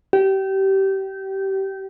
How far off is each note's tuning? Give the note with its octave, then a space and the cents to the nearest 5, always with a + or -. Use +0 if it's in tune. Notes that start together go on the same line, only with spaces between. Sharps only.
G4 -25